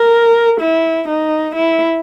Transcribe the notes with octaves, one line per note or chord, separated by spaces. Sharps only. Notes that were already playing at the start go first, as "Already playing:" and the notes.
Already playing: A#4
E4
D#4
E4